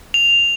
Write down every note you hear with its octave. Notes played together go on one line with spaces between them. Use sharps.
F7